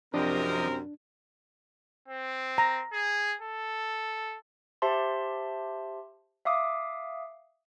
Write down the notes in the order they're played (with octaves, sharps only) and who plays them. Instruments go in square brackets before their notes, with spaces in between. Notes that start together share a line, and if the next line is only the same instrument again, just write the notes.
[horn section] F#2 C3 A#4 [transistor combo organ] F3 G4 D#5 [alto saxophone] C4 [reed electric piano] D4
[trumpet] C4
[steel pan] A#5
[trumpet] G#4
A4
[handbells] G4 C5 E5 A5 C6
E5 F5 D6 D#6